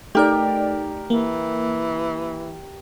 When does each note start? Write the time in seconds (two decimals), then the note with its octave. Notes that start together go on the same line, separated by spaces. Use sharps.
0.15 A3 D#4 G4 A#4 D5
1.10 E3 A#3